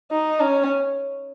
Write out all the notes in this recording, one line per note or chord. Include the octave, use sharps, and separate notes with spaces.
D#4
C#4